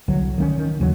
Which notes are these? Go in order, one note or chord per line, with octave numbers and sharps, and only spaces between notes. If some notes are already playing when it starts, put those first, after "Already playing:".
C2 D3 F#3
D#3 B3 C#4
D#3
D#2 C#3 F#3